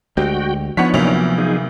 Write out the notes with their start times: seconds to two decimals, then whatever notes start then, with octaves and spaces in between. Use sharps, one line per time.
0.17 D2 G#3 F#4 G4 G5
0.77 F3 B3 D4 D#4 C#5 F#5 C#6 B6
0.94 D2 C3 F#3 A#3 F7
1.38 D#4 G#4